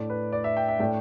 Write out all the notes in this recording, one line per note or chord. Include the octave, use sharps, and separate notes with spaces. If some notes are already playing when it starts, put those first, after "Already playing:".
Already playing: A2 A3 D4 D5
B4
D5
E5
G5
E5
A2 A3 D4 G5